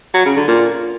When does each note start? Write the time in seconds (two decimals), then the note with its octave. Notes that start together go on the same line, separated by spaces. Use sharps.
0.14 F#3
0.25 C#3
0.37 D3
0.48 A#2